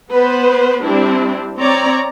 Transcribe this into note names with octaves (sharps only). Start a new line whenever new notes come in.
B3 B4 C5
G3 C4 D4 E4
C4 C#5 D5 A#5